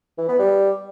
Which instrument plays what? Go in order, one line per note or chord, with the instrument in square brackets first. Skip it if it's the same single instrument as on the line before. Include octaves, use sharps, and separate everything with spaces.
[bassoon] E3
B3
G3